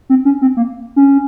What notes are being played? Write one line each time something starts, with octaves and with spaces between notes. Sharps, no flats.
C4
C#4
C4
A#3
C#4